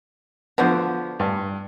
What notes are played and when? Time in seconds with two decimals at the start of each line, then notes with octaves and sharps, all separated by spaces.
0.58 D3 F3 B3 F#4 C5
1.20 G2